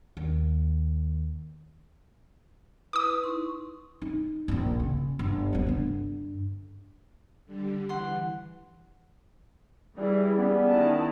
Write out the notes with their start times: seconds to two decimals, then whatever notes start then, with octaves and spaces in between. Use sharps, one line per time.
0.17 D#2
2.93 E4 B4 D6 D#6
3.24 D#4 C6 C#6
4.02 D#4
4.48 D#1 A#1
4.80 C#3
5.19 G1
5.53 F#3 B3
5.67 G2 D3
7.45 D3 G3
7.89 E3 F#5 C6
9.96 E3 G3 E4 G#4
10.36 G3 B3 C#4
10.67 D#3 E4 A5